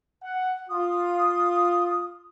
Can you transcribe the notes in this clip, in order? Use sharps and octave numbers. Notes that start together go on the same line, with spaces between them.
F#5
F4 D#6